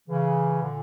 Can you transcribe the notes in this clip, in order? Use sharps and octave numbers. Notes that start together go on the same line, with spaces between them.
C#3 E3
A#2 D3